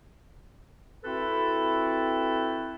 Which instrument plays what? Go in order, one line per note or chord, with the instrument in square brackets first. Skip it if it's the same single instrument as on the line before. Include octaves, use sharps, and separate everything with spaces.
[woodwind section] C4 E4 F#4 A4 B4